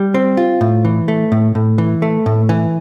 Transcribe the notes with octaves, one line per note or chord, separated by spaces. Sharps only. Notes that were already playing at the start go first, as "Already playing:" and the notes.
Already playing: G3
C4
F4
A2
E3
A3
A2
A2
E3
A3
A2
E3